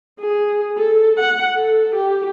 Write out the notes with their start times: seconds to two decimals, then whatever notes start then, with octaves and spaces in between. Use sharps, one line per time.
0.19 G#4
0.77 A4
1.19 F#5
1.57 A4
1.95 G4